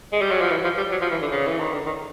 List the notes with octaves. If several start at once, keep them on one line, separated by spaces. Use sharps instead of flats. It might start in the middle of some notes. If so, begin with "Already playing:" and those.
G#3
G3
F#3
F3
E3
F3
G3
F#3
F3
E3
D3
C#3
E3
D#3
D3
D#3